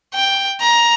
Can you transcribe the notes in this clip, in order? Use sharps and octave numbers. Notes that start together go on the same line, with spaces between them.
G5
A#5